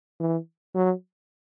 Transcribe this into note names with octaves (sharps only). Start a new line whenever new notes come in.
E3
F#3